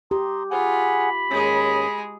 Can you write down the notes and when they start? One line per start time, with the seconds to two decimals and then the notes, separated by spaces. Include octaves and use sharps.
0.11 G4 A#5 C6 D#6
0.51 F4 G#4 F#5 G#5 B5
1.30 D#2 G#3 C#4 G#4